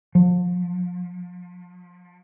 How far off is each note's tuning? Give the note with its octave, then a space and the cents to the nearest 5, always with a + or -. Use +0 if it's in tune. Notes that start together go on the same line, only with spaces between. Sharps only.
F3 +35